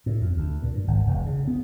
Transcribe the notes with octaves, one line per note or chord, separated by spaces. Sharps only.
A2
F2
D2
A#2
G2
G#1
E1
C#3
B3